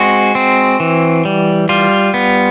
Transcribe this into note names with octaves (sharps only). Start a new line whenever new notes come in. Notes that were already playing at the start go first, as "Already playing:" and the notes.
Already playing: G#3 C4 F#4
C4
E3
G3
G3 F4
B3